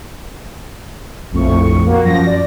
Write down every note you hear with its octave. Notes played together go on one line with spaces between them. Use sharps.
A#1 F2 A2 C#6
A#3 F#4
F#2 F3 A#6
D5